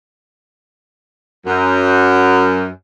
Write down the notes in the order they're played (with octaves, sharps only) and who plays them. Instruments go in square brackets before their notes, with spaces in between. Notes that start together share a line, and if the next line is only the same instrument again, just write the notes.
[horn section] F#2